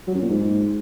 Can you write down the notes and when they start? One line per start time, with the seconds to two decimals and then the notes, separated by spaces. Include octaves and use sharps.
0.07 F#3
0.15 F#2
0.22 A#2
0.30 G#2